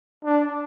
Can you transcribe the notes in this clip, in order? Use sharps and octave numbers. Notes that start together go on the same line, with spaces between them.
D4